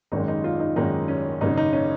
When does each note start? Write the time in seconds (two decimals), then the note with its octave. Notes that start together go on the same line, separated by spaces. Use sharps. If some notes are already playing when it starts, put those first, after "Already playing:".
0.12 G#1 F#2 D#3 G#3 D#4
0.28 D#4
0.44 F4
0.60 D#4
0.76 G#1 F#2 D#3 G#3 D#4
1.08 C#4
1.41 G#1 F#2 C#3 D#4
1.57 D#4
1.73 C#4